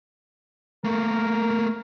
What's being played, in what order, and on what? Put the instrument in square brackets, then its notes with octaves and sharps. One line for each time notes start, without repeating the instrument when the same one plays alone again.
[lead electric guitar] A3 A#3 [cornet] A#4